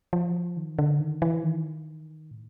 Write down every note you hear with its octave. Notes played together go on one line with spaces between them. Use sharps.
F3
D#3
D3
D#3
E3
D#3
A2